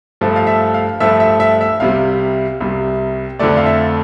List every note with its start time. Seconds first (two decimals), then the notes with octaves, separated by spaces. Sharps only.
0.21 G2 F3 A3
0.36 F5
0.47 E5
0.74 F5
1.00 G2 F3 A3 E5
1.20 E5
1.40 E5
1.61 E5
1.80 C2 C3 G3 F5
2.60 C2 C3 G3
3.39 F2 D3 A3 D5
3.57 F5
3.66 E5